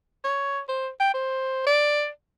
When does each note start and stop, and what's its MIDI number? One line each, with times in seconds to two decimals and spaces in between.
0.24 0.61 73
0.69 0.89 72
1.00 1.12 79
1.14 1.65 72
1.67 2.09 74